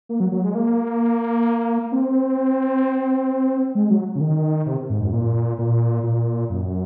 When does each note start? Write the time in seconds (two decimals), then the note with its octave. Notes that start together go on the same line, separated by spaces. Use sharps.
0.09 A#3
0.20 F#3
0.32 F#3
0.43 G#3
0.55 A#3
1.92 C4
3.75 G#3
3.90 F#3
4.15 C#3
4.21 D#3
4.66 C3
4.90 G#2
5.01 F#2
5.12 A#2
5.58 A#2
6.03 A#2
6.50 F#2